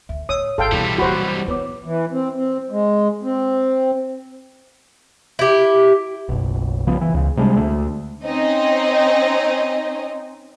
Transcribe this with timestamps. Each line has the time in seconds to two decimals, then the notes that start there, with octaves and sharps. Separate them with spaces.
0.09 D2 E5
0.29 A2 C#5 D#6 E6
0.58 G#1 G#4 A4 F5 G5 A5 C6
0.72 B2 E3 G3
0.98 A#1 F#3 E4 F#4 G4 C5 B5
1.48 B3 B4 C#5 D6
1.84 E3
2.12 C4
2.36 C4
2.71 G#3
3.23 C4
5.39 E4 G4
6.29 F#1 B1
6.87 C2 C#3 F3 B3
7.01 E3
7.14 C#2 C#3
7.37 C3 G3 G#3 D4
7.56 D2 A3
8.25 C4 C#4 D#4 D#5